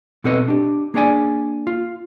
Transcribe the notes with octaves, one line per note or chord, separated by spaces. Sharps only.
B2 C4 A4 B4 C#5 D#5
D4 G4
A#3 D4 G#4 C#5 D5 G#5
F4